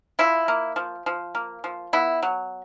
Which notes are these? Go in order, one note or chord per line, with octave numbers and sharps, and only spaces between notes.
F3 E4
A#3
F3
F3
A#3
F3
B3 E4
F#3